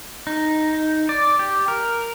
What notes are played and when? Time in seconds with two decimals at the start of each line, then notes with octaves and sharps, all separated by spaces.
0.27 D#4
1.09 D5
1.39 G4
1.68 A#4